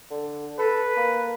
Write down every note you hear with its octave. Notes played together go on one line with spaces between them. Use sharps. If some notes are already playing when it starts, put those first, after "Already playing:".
D3
A4 B4
A#3